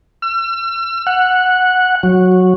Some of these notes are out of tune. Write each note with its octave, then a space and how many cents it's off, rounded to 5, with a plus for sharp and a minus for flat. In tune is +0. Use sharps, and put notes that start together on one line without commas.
E6 +45
F#5 -10
F#3 -10